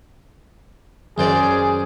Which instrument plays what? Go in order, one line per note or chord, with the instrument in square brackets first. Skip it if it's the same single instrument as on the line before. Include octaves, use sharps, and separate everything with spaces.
[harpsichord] F#2 C5 D5 [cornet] G#4